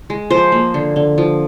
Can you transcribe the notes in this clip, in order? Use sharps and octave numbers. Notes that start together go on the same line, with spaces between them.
G#3
F3 C5
A#3
D3
D3
F3